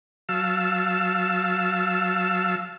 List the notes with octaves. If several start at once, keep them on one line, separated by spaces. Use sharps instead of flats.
F#3 F5 A5 E6